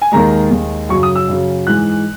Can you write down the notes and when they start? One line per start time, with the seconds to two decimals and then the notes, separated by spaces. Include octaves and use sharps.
0.02 G#5
0.12 D#2 D#3 G#3 A#5
0.50 D#2 D#3 G#3
0.89 F#2 C#3 F#3 C#6
1.03 D#6
1.16 E6
1.28 F#2 C#3 F#3
1.67 G#2 E3 G#3 F#6